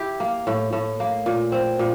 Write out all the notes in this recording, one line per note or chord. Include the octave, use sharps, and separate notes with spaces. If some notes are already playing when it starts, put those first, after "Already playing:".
Already playing: E4 G4
A#3
A2
A2
A#3
A#2
C4
A#2